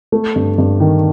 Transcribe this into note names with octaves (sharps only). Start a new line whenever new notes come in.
A3
G2
G2
D#3